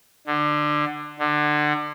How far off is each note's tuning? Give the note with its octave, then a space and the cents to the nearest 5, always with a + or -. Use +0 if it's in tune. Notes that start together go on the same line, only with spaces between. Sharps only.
D3 +20
D3 +25